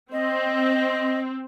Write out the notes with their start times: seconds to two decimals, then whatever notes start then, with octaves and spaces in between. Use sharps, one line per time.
0.12 C4 D#5